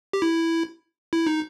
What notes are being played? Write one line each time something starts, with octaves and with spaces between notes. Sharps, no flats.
G4
E4
E4
D#4